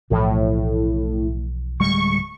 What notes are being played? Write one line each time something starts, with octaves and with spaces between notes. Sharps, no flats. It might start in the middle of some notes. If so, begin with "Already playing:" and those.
B1 A2 E3 F3
D1 G3 G#3 C#6